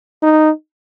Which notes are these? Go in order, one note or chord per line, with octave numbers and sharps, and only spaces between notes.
D#4